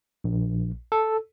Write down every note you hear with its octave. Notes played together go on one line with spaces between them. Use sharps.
A#1
A4